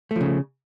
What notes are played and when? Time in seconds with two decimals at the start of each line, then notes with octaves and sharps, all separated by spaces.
0.11 A3
0.16 F3
0.21 C#3